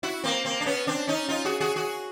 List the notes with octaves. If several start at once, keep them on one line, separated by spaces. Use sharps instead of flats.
E4 F#4
A#3 C4
A#3 C4
D4
B3 C#4
C4 D4
C#4 D#4
D#4 F4
F#4 G#4
F#4 G#4
F#4 G#4